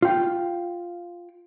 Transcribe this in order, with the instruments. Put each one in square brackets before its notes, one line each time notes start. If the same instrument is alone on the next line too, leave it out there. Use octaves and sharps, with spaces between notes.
[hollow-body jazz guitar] F4 G5